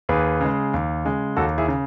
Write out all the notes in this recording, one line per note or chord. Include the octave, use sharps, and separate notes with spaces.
D#2 G#4 B4
C#3 G#3
D#2
C#3 G#3
D#2 F#4 A4
E4 G#4
C#3